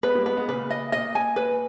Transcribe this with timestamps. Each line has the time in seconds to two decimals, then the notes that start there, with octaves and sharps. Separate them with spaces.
0.03 G#3 B3 B4
0.15 G3 A#3
0.26 G#3 B3 B4
0.37 G#3 B3
0.48 A#2 C#3 B4
0.70 D#5
0.92 A#2 D#5
1.15 G#5
1.36 B4